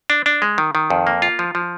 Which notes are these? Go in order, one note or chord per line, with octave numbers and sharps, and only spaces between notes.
D4
D4
G#3
D#3
D#3
F2
A#3
F4
F3
F3